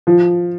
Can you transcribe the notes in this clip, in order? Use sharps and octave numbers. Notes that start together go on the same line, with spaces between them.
F3